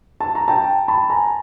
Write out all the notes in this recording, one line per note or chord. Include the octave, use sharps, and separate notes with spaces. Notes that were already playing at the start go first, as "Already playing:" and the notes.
A5
A#5
G5 A5
A5 B5
G#5 A#5